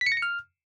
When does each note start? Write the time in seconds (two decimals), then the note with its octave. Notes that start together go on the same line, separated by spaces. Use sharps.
0.01 B6
0.06 C#7
0.12 A#6
0.17 C#7
0.22 F6